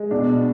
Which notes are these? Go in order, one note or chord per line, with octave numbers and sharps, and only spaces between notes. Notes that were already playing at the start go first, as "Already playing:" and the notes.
Already playing: G#3
B2 D4